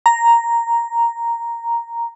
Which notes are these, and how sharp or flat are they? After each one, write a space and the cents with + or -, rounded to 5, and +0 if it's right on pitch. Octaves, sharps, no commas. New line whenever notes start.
A#5 +0